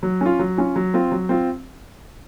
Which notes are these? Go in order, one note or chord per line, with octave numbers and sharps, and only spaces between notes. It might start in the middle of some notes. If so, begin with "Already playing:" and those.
F#3
C#4 F4
F#3
C#4 F4
F#3
C4 F4
F#3
C4 F4